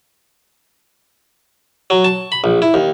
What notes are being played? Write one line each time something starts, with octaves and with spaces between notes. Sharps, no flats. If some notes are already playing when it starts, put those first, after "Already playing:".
F#3
A5
B5
A#1
E4
D#2